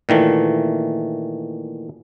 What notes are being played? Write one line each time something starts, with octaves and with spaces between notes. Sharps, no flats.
A#2 D#3 E3 A3